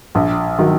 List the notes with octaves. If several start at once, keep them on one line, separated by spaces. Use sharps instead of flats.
A#1
D#3 F#3